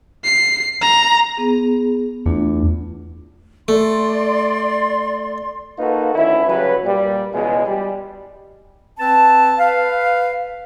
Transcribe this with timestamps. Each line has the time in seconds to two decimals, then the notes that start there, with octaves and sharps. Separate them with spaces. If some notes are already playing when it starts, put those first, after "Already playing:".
0.24 C7
0.82 A#5
1.37 B3 G#4
2.26 E2 A3 D4 F4
3.68 A3 D5 C6
5.79 A#3 D#4 F4 F#4 A4 B4
6.14 D2 D#3 C#4 E4
6.48 C#3 F#3 G3 B4
6.84 A#2 G3
7.34 C#2 B2 E3 G#3
7.66 G3
8.99 C4 B4 A5
9.59 B4 F5